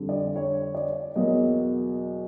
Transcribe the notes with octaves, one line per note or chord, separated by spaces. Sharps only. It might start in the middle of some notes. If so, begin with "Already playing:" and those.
Already playing: F2 D3 G3
D5
C#5
D5
E2 B2 F#3 A#3 D#5